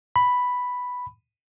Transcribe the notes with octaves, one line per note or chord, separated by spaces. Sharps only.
B5